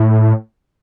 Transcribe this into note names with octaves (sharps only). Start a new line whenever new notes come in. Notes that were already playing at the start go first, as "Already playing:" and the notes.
Already playing: A2